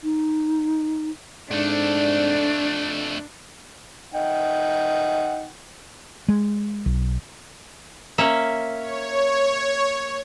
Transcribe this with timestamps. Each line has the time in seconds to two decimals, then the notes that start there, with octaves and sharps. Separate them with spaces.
0.04 D#4
1.51 F2 G#2 A3 C4 D4 D5
4.14 D#4 F#5 G5
6.29 G#3
6.86 B1
8.18 A#3 C#4 E5
8.75 C#5